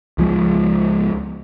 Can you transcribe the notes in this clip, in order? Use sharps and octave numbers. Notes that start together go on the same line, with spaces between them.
C#2 F3 G#3